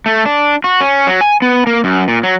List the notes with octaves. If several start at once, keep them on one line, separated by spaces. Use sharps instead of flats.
A3
D4
F#4
C#4
F#3
G#5
B3
A#3
F#2
A#2
F#3